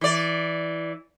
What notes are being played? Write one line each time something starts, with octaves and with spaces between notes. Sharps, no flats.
E3 D5